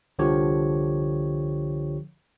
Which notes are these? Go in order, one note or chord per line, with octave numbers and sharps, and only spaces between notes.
C2 D3 F3 G4 C#5